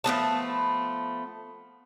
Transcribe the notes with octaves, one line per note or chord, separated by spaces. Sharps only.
F3 A3 B3 A5